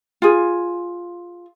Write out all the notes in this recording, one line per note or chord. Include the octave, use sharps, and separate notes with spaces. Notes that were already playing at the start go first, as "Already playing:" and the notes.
F4 G#4